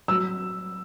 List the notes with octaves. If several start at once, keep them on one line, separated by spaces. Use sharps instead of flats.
F#3 E6